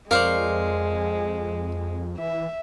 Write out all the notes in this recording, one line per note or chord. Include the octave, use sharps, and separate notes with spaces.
F2 G#3 A#4 C5 D5 F5 C#6 D6
E3 E5